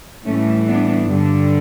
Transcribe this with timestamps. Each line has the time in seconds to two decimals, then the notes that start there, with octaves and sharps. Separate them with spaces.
0.25 A2 E3 G3 A3 C#4
0.67 B3 D4
1.10 G2 D3 G3